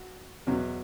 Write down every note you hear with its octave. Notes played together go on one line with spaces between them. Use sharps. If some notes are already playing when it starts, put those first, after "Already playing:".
Already playing: F#4
E2 B2 F#3